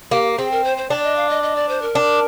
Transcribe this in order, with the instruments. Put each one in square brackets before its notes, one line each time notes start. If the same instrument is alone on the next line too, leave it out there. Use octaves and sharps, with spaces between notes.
[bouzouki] A#3 [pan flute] G4
[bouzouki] C4 [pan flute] G#4
[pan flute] A#4
C5
C5
[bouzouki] D4 [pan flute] D5
[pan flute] D#5
F5
D#5
D#5
D5
C5
A#4
[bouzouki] D4